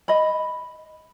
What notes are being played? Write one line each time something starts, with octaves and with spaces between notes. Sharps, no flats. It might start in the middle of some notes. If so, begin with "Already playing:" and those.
D#5 B5